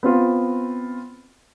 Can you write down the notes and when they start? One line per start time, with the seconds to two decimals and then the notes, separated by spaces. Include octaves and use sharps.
0.03 B3 C4 F4